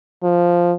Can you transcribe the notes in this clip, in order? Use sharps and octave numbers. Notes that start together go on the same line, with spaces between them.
F3